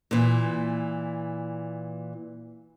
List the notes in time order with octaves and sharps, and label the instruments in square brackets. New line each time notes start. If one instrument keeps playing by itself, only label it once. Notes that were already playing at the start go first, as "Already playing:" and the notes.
[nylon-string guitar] A#2 E3